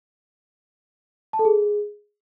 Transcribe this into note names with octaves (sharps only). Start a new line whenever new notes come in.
A5
A4
G#4